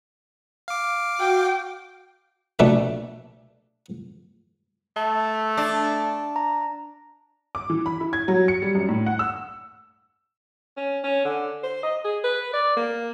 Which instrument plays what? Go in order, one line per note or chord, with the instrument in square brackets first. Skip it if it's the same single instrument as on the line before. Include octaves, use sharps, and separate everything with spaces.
[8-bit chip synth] F5 D6
[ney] F#4 [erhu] G5
[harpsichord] A#1 B2 A3 D4 D5 E5
[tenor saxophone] A3 [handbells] A5
[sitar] D4
[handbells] A#5
[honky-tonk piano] D6
E3
B5
E4
G#6
F#3
C#7
G3
F#2
A2
F#5
E6
[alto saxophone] C#4
C#4
D3
C5
D#5
G#4
B4
D5
A#3